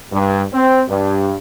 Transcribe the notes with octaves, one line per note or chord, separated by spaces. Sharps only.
G2
C4
G2